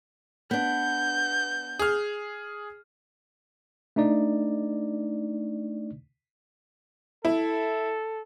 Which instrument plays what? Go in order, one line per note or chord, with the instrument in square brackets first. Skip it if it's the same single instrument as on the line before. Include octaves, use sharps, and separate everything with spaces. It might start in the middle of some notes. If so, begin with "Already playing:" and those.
[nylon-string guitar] B3 D4 [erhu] G6
[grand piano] G#4 F6
[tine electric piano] A3 D4 D#4 D5
[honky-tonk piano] E4 [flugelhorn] A4